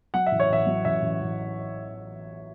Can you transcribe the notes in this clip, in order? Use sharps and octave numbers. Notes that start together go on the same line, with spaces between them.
F#3 F#5
E5
A1
C#5
A1 E5
F#3
A1 E5
A1
A1